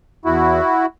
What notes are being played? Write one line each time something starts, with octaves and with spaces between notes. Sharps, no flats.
E2 E4 F#4